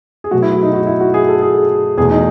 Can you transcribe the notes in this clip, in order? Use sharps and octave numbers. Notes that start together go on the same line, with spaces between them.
G#4
B2 F#3 A3 F#4
E4
E4
D#4
F#4
E4
F#4
G#4
A4
G#4
E2 B2 A3 G#4
D#4